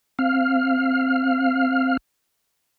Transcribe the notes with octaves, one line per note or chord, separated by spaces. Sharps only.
C4 F5 F6